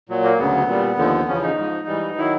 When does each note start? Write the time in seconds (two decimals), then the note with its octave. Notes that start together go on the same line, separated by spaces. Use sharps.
0.09 A#2 F#3
0.24 A#3
0.38 D2 C#3 F#3 B3
0.68 A#2 G3
0.97 D#2 D3 F3
1.28 E2 C#3 F3 C#4
1.42 D#4
1.58 G#2 F3
1.87 G#2 E3 G3
2.17 D#3 F#3 E4